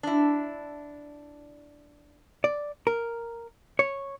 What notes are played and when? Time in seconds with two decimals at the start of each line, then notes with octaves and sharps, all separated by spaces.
0.03 D4 E4
2.44 D5
2.87 A#4
3.79 C#5